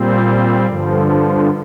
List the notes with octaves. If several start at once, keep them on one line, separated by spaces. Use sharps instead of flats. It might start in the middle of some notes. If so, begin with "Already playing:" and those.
Already playing: A#2 G3 C4
G2 D3 F3